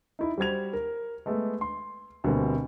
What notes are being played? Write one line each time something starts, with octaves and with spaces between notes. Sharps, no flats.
D#4 E4
G3 F#4 C5 G#6 F7
A#4
G#3 A3 B3
C6
D2 B2 G3 A#3 C4